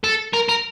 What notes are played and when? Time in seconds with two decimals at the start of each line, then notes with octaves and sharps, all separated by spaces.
0.04 A4
0.34 A#4
0.49 A#4